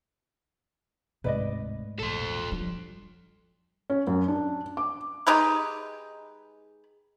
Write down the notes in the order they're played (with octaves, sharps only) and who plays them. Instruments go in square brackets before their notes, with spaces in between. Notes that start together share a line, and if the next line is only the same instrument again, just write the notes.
[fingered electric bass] D1 C3 [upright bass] G#2 A3 [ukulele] B4 D5 D#5
[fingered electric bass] E1 A#1 [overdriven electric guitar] A4 C5
[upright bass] F2 F#3 [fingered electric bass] G3 D4
[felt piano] C#4
F#2
D4
D6
[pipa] G#3 D#4 G4 B4